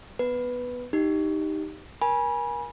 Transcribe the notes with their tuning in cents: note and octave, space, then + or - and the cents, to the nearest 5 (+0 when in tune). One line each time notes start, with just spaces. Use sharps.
B3 +0 B4 +0
D#4 +0 G4 +0
A#4 +30 G#5 +0 B5 -30